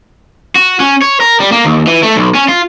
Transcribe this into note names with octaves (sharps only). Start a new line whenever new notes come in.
F#4
C#4
C#5
A#4
G3
A#3
D#2
E3
A3
B1
C#4
F4